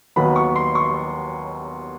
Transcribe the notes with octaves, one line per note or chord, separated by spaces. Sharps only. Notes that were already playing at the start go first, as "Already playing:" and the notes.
D#2 D#3 F#3 B3 B5
C#6
C6
C#6